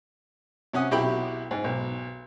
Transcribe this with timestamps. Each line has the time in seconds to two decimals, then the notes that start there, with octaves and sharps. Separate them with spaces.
0.73 C3 C#4 F#5 D#6
0.91 B1 E4 F#4 G4 G5 B5
1.51 G#2
1.64 B1